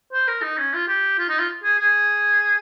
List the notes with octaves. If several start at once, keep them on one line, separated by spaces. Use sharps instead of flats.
C5
A#4
D#4
C#4
F4
G4
F4
D#4
F4
G#4
G#4